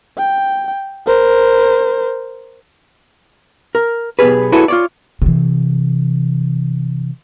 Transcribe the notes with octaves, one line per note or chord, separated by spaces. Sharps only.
G5
A#4 C5
A#4
B1 B3 G4 G#4 B4
E4 F#4 G#4 A4 B4 C#5
F4 C#5 D5
C3 E3